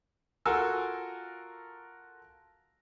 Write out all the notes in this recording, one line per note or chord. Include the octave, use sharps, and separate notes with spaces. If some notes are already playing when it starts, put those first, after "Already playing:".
F4 F#4 A4 A#4 G#5 E6